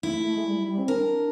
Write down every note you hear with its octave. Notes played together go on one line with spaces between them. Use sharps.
A3 E4
A3
A3
G#3
G3
G3
G3
C4
D4 A#4